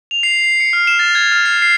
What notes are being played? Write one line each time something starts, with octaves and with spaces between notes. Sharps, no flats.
F7
C7
C7
C#7
F6
E7
A6
G#6
F6
C7
C7